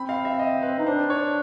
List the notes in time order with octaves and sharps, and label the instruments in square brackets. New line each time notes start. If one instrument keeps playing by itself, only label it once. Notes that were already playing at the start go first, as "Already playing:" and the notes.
Already playing: [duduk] C4 [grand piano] B5
[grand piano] F5
E5
D#5
B4
[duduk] D#4
[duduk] D4 [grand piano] C5
[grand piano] C#5